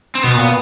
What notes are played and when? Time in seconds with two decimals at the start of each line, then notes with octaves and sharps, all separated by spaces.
0.15 C4
0.23 B2 B3
0.36 A#2